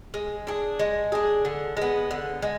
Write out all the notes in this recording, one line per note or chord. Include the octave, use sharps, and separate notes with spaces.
G#3
D4 G#4
G#3
D4 G#4
D3
G#3 B3
D3
G#3